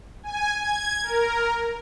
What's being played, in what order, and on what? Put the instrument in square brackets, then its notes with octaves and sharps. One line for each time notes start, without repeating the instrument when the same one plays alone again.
[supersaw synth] G#5
G#6
A#4